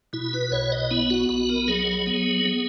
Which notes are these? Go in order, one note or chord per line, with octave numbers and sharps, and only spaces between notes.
B2 E4
B4
B1 C#5
D#5
B3 E4
F#4
B1 F#4
A#4
F#3 G#4
B3
B3